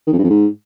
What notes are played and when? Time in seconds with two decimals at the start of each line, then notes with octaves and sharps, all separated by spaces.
0.07 D#3
0.12 F2
0.18 G2
0.24 F2
0.30 G#2